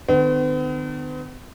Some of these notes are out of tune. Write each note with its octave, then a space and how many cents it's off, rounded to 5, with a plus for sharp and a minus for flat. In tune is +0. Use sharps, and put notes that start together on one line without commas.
D#3 -45 B3 +45